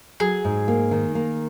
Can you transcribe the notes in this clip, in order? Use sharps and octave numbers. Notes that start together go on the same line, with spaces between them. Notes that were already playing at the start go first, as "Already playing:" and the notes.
F#3 G#4
G#2
A#3
D#3
A#3